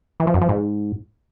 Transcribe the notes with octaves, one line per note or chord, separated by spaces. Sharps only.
E3
F3
F#2
F3
G#2